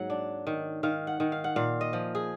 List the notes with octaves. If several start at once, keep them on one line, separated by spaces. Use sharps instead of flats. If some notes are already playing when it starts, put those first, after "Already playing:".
Already playing: G#2 F#3 A#3 F#5
D4
D#3
D#3 F5
F#5
D#3
F5
F#5
A#2 F5
D#5
F3
G#4